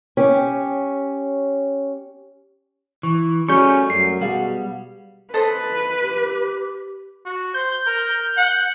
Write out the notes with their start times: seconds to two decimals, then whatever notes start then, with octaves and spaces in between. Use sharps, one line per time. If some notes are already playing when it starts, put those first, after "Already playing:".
0.17 C#4 G4 C#5
3.03 E3 C#6
3.48 G3 A3 C#4 F#4 G#4 D5 C#6 G6
3.90 F#2 C7
4.21 B2 G3 G#4 F5 F#5
5.34 A4 B4 C5 D#5
6.03 G4
7.26 F#4
7.54 C5 G6
7.87 A#4
8.38 F#5